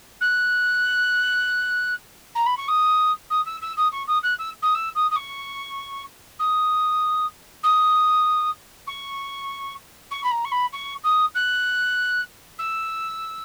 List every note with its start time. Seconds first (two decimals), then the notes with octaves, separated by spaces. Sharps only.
0.20 F#6
2.35 A#5
2.46 B5
2.57 C#6
2.68 D#6
3.30 D#6
3.45 E6
3.61 E6
3.76 D#6
3.92 C#6
4.07 D#6
4.23 F#6
4.38 E6
4.62 D#6
4.74 E6
4.95 D#6
5.10 D#6
5.15 C#6
6.39 D#6
7.63 D#6
8.86 C#6
10.10 C#6
10.23 B5
10.31 A#5
10.44 C#6
10.51 B5
10.72 C#6
11.03 D#6
11.34 F#6
12.58 E6